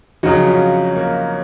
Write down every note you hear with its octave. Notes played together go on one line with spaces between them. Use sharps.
F2 C#3 F#3 D#4 F#4
C#4 F4
A#3